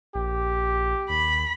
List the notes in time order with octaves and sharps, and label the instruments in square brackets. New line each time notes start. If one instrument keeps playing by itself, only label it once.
[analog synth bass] A#1 [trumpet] G4
[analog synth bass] D#2 [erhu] B5